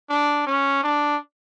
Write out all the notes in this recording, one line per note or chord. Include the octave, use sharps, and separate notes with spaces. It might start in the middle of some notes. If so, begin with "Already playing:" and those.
D4
C#4
D4